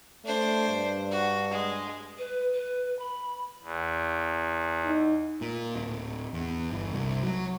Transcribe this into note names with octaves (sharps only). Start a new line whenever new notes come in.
A3 D4 C5
G2
F#4
G#3
B4
B4
B5
E2
D#4
A#2
D1
E2
G1
C2
F#3